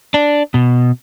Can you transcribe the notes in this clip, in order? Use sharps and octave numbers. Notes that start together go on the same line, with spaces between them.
D4
B2